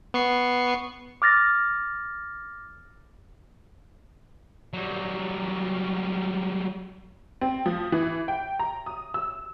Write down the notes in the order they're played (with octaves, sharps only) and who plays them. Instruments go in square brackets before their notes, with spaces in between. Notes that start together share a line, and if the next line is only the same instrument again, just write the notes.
[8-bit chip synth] B3 C#6 C7
[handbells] D6 F6 A6 A#6
[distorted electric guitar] F#3 G3
[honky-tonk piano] C4
F3
E3
G5
A#5
D#6
E6